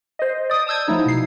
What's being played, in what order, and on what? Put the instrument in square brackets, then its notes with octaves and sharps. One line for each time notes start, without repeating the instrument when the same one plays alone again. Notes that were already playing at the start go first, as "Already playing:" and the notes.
[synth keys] C5 D#5
D5 D#6
A5 D#6 E6 G6 G#6
F3 F#3 A3 D#4 E4
B2 C7